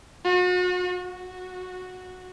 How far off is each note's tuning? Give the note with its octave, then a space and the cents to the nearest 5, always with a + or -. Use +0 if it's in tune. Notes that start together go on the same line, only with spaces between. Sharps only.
F#4 -40
F#4 -10